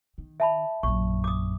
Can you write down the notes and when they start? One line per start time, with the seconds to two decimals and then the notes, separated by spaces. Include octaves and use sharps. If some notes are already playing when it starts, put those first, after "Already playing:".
0.18 D#3
0.40 E5 A5 B5
0.83 A#1 F#2 C#6
1.24 D6 D#6